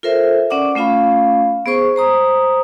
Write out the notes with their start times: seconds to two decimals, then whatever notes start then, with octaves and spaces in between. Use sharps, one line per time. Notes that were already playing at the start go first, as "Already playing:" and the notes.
0.03 F4 A4 A#4 C5 E5
0.50 C#4 D5 F#5 D6
0.75 A3 C#4 F4 F5 B5
1.66 B3 G#4 C5 C#6
1.96 C5 A#5 D#6